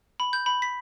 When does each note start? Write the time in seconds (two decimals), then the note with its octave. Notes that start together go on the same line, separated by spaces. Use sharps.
0.20 B5
0.33 G6
0.46 B5
0.62 B6